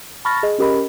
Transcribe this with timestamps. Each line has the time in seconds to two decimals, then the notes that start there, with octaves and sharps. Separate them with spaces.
0.25 A5 B5 C#6 F6 A6 A#6
0.43 G#4 D#5
0.58 C#4 G4 A#4 D#5 B5